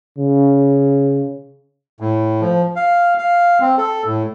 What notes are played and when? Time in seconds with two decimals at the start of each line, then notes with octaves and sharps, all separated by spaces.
0.18 C#3
2.00 A2
2.41 F3
2.76 F5
3.18 F5
3.61 C4
3.78 A4
4.05 A2